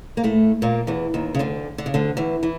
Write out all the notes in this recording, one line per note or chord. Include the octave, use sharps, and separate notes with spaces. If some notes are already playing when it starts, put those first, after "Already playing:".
A#3
A2 A3
A#2 A#3
E2 E3
D#2 D#3
C#3
D2 D3
D3
C#3
D2 D3
E2 E3
E3